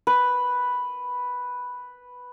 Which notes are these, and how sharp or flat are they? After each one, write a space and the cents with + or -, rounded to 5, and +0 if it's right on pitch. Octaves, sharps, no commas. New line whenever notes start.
B4 +0